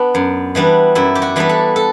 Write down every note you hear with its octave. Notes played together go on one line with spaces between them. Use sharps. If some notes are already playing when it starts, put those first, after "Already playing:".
Already playing: B3 D4 B4
F#2
E3 G3 B3 D4
F#2 E4
G4
F#4
E3 G3 B3 D4 B4
A4
A4